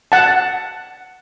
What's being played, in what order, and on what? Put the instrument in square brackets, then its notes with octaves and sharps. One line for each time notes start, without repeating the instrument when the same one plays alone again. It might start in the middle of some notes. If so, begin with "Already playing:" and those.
[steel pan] F#5 A5